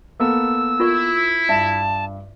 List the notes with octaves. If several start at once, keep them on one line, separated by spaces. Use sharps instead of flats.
A#3 B3 A4 E6
E4 F4 A#4 C#6
G2 E5 A5